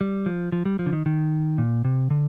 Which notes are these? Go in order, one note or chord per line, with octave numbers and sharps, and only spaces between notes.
G3
F3
F3
G3
F3
D3
D#3
D#3
A#2
C3
D3